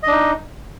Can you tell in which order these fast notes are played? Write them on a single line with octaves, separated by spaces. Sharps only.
D#5 D4 D#4